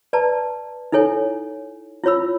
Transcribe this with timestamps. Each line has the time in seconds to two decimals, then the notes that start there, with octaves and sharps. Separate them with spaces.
0.13 B4 D5 A5 A#5
0.92 D#4 E4 A4 C#5 G#5
2.04 E4 F4 C#5 B5 E6